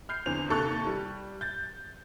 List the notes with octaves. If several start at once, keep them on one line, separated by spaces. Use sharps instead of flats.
F6 G6 C7
E2 D3 C4 C5 F7
D#2 C3 A4 C#6 F#6
G3
G6 A6